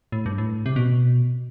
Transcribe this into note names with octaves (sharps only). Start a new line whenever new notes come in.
A2
G2
A2
C3
B2